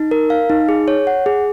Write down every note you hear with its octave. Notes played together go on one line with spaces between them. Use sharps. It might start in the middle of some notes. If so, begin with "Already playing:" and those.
Already playing: D#4
A#4
F5
D#4
G#4
C#5
F#5
G#4